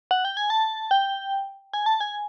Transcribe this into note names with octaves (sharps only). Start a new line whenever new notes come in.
F#5
G5
G#5
A5
G5
G#5
A5
G#5